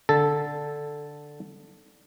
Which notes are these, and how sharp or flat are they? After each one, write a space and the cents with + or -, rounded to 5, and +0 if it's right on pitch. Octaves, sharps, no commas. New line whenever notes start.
D3 +0 A4 +0 A5 +0